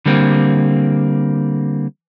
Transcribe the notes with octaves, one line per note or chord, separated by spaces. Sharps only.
D3 G3 A#3 C4